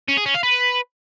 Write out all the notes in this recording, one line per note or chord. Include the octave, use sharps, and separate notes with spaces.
C#4
G#4
C#4
F5
B4